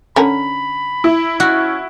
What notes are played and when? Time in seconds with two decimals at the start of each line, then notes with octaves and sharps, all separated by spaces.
0.16 D3 C#4 A#4 B5
1.04 E4
1.40 C#4 F#4